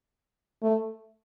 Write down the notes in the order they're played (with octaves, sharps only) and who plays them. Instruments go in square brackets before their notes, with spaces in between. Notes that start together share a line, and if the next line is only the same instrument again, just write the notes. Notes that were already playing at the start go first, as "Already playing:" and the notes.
[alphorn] A3